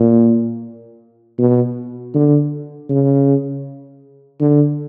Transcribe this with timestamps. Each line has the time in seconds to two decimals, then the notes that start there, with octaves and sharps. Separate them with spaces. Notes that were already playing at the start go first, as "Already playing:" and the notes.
Already playing: A#2
1.39 B2
2.14 D3
2.90 C#3
4.41 D3